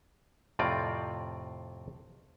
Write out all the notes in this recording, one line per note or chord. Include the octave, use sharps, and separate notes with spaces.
F2 A2 C3 C4 F4 D5